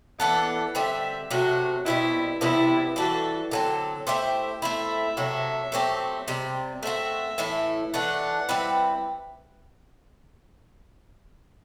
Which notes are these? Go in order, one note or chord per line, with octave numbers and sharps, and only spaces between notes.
E3 B3 D4 A4 F#5
D3 G3 C4 E5
C3 F#3 A3 F#4
B2 G3 C4 E4
C3 E3 G3 B3 E4
E3 G3 D4 F#4 A4
D3 F#3 C4 A4
A3 E4 G4 C5 E5
A3 C4 E4 E5
C3 F#3 A3
F#3 A3 C4 G4
C3 G3 C4
A3 C4 F#4 E5
A2 E3 A3 E4
E3 A3 D4 F#5
G3 C4 E4 B4